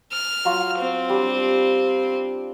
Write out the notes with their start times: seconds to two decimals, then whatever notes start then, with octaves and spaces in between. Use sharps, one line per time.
0.12 F6
0.45 F#3 F4 F#4
0.79 C4
1.09 G3 D4